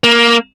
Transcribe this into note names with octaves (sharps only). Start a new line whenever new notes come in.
A#3